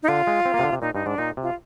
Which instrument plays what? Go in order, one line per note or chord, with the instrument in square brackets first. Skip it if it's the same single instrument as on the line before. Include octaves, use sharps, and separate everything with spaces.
[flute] D#4
[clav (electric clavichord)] D3 [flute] F4
[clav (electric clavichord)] G#3
C4
A#3
C3
D3
C3
[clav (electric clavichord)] A#2 [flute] D#4
[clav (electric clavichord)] G2 [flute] D#4
[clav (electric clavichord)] G#2 [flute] D4
[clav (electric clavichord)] A#2 [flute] D#4
[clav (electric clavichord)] C3
[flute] F4